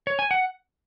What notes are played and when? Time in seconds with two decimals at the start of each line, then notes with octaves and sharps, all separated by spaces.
0.07 C#5
0.19 G#5
0.31 F#5